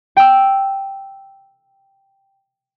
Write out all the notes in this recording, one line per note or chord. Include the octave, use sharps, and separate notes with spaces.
G5 E6